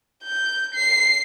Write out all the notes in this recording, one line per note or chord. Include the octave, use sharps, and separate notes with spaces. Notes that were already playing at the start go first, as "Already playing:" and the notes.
G6
C7